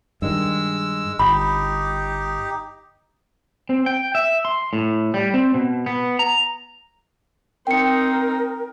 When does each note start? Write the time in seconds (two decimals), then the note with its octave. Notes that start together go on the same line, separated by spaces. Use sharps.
0.22 G2 D#3 G#3 E6
1.19 G1 D#4 G4 B5
3.70 C4
3.86 G5
4.15 E5
4.45 C6
4.73 A2
5.14 G3
5.34 C4
5.54 B2
5.86 B3
6.19 A#5
7.67 C4 D#4 A#4 G5 C#7